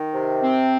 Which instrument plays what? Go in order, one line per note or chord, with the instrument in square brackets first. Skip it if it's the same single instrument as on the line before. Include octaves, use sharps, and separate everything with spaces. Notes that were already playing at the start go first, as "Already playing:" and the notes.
Already playing: [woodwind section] D#3
C3
C4